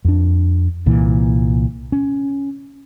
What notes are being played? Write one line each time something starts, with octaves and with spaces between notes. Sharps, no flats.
F2 D4
C2 A#2 E3
C#4